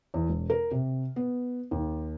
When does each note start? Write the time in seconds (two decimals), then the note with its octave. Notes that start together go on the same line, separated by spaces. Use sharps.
0.14 E2
0.29 E1
0.50 A#4
0.71 C3
1.16 B3
1.71 D#2